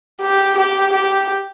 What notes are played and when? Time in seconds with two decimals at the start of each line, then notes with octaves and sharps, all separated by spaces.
0.21 G4
0.57 G4
0.93 G4